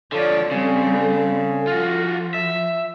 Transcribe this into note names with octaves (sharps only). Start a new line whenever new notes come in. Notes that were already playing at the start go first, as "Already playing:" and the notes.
D3 F3 A4 C#5 D5
C#3 G3 C4
F3 F4 F#4
E5